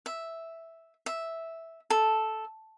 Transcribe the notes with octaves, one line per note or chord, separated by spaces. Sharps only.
E5
E5
A4